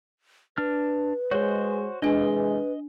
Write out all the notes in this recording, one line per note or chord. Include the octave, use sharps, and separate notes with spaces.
D4 B4 F6
G#3 F#4 C5 C#5
C3 E3 G#3 D4 B4 D#5 G#5